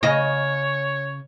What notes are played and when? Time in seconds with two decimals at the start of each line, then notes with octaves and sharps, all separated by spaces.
0.03 C#3 C#5 D#5